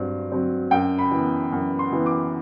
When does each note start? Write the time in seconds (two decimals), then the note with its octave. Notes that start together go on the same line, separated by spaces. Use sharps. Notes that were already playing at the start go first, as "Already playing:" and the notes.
Already playing: G2 F#3 C4
0.32 F#3 C4
0.71 F#2 G5
0.98 B5
1.11 E3 B3
1.52 F#2
1.79 C6
1.92 E3 B3
2.06 D6